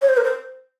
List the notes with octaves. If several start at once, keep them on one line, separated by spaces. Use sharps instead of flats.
C#5
C5
A#4
C5